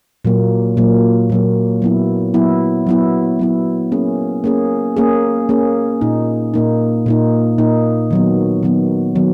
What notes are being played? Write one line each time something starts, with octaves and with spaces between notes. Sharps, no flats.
A#2 F#3 A#3
A#2 F#3 A#3
A#2 F#3 A#3
F#3 B3 E4
F#3 B3 E4
F#3 B3 E4
F#3 B3 E4
A#3 C#4 G#4
A#3 C#4 G#4
A#3 C#4 G#4
A#3 C#4 G#4
A#2 A#3 D#4
A#2 A#3 D#4
A#2 A#3 D#4
A#2 A#3 D#4
D#3 F#3 B3
D#3 F#3 B3
D#3 F#3 B3